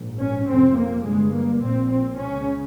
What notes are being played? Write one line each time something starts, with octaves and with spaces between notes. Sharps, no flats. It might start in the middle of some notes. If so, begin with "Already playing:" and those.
Already playing: A#1 G#2
C#4
F1 F2 C3 C4
A#3
G1 G2 G#3
A#3
A#1 A#2 C4
C4
C#2 C#3 C#4